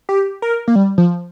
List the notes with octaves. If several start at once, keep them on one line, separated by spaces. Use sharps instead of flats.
G4
A#4
A#3
G3
F3